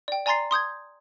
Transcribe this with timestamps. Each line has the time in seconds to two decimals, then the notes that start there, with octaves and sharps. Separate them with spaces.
0.08 D5 G5
0.26 D5 G#5 A#5 C6 A6 C7
0.51 C6 D#6 G6 G#6